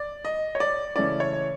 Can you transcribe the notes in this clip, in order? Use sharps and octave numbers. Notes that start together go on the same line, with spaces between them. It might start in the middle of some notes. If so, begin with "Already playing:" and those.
Already playing: D5
D#5
C#5
D5
C#3 E3 A3 C#4 D5
C#5